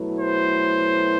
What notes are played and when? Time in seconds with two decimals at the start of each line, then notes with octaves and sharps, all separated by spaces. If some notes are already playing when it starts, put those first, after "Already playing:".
Already playing: B2 F#3 A3 E4 B4
0.19 C5